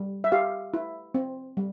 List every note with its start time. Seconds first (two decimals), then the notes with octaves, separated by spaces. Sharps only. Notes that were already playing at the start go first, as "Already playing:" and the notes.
Already playing: G3
0.24 E5
0.32 G4 F5
0.74 E4
1.14 C4
1.57 G3